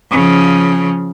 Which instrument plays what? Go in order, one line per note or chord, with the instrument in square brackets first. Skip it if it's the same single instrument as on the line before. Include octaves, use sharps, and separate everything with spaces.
[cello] C#3 F3